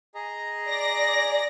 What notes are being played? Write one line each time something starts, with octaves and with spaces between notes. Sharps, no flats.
G#4 D#5 A#5
D5 A#6